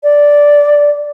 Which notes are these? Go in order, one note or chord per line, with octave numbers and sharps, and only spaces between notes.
D5